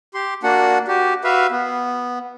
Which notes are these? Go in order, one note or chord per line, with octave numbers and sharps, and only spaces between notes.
G4 C6
A#3 D4 F#4 F#5
F#4 G4
F#4 B4 E5 F5
B3